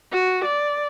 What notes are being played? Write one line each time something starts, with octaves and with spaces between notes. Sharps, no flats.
F#4
D5